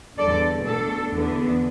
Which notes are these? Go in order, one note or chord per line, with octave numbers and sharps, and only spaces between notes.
E2 D3 G3 A4 D5
B2 A3 D4 A4
E2 D3 B3 D4